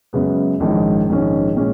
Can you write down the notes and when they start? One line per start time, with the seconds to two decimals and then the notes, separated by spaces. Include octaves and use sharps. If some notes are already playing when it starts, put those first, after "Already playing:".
0.13 F#2 C#3 G#3 B3
0.60 A#1 G#2 D#3 G#3 C#4
1.09 A#1 G#2 D#3 G#3 C#4
1.57 A#2 G#3 C#4